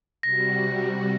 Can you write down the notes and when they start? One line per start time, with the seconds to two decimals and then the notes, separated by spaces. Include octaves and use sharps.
0.23 C3 G3 F#4 A#6